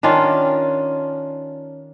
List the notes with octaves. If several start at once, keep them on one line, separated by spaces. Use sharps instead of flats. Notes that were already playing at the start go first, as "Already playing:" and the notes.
D#3 C#4 D4 F4